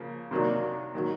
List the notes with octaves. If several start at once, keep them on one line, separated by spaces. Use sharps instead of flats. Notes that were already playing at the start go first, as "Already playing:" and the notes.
Already playing: C#3 F3 A#3
C3 D#3 F#3 A#3 D4
D#3 F#3